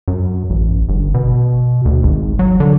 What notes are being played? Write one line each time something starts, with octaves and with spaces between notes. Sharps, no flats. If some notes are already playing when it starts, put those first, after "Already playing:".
F#2
A1
G1
B2
D2
G#1
F#3
D3